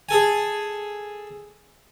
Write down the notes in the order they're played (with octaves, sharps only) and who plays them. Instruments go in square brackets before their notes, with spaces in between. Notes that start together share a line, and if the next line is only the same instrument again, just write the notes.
[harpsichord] G#4 A4 G#5